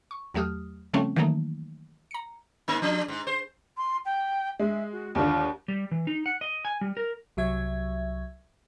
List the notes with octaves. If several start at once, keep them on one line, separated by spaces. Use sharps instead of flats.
C#6
E2 F#3 A3 G4 D#6 F6
C#3 F3 G3 A3 C4 C#4
D#3 E3 F#3 A3 A#3 D#4
A#5 C#7
G#2 A#3 D#4
F3 D4
G#2
C5
C6
G5
G#3 E5
F#4
D#2 D3 F4
G3
E3
D#4
F#5
D#5
G#5
G3
A#4
C2 F#3 E5 G#6